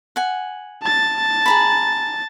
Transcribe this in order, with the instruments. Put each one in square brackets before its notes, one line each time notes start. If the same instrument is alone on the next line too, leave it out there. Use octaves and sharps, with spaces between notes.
[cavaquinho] F#5 G#5
[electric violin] A5 A6
[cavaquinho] G#4 A#5 B5